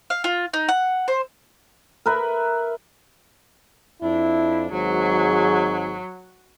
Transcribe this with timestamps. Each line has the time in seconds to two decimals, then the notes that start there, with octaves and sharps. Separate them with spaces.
0.10 F5
0.24 F4
0.53 D#4
0.69 F#5
1.08 C5
2.06 A#4 B4 E5
4.03 F2 D4 E4
4.72 G#1 G#2 F#3 G#4